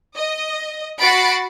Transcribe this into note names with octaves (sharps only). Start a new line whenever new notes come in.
D#5
F#4 F#5 B5 A6 C7 D7